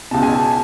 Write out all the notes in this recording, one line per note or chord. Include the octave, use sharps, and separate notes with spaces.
C#2 B2 A5
G#5
A5
A5